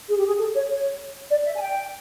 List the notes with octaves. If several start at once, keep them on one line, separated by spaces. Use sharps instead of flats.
G#4
G4
G#4
A4
C#5
C#5
D5
E5
G#5
G5